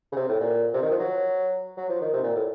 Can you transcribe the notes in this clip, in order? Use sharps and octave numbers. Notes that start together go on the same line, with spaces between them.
C#3
C3
A2
A#2
C3
D#3
F3
F#3
F#3
F3
D#3
C3
A#2
A2